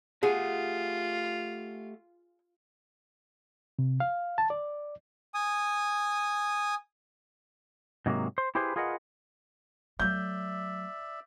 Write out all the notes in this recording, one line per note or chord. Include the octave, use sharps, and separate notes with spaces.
A3 F4 G4 G#4 F#5
C3
F5
A5
D5
G#5 D#6
G#2 C3 F#3 G#3 A#3
C5
E4 G4 G#4 B4 C5
F4 G#4 A#4 B4 D#5 F#5
F#3 A3 D5 E5 G6